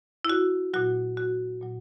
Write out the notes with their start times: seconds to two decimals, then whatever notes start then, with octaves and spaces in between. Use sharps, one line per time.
0.25 E4
0.29 F#4
0.74 A#2 F#3 F#4
1.17 F#4
1.61 A#2 F#3